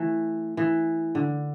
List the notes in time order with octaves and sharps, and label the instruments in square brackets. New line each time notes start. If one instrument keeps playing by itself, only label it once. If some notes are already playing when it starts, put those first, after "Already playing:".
Already playing: [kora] E3 A3
E3
D3